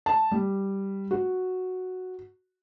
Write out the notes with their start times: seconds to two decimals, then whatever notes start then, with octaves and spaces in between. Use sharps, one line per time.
0.06 A5
0.31 G3
1.11 F#4